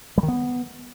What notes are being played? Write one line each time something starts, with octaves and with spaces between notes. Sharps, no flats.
G3
D#3
B3